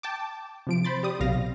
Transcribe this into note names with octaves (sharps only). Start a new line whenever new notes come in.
G5 A5 D6
C3 F3 D7
C5 B5 C6 A6
G4 D5 D#6
B1 C3 F5 A#6